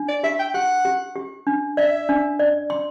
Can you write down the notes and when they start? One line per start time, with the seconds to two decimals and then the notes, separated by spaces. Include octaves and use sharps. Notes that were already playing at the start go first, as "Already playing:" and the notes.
Already playing: D4
0.08 D5
0.23 G4 E5
0.39 G5
0.54 G4 F#5
0.85 G4
1.16 G4
1.47 D4
1.77 D5 E5
2.09 D4
2.39 D5
2.70 C6